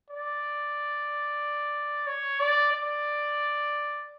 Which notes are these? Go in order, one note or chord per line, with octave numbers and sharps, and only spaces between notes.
D5
C#5
D5
D5